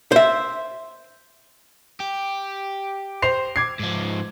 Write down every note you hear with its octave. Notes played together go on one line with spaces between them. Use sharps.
C5 E5
G4
C5 C7 F7
D6 G#6 C7
G#2 F3